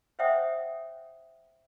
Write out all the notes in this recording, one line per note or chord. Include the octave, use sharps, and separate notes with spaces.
C5 C#5 E5 F#5 G5 D#6